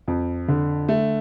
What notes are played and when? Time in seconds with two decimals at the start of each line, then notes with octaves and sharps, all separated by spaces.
0.08 F2
0.48 D3
0.89 A3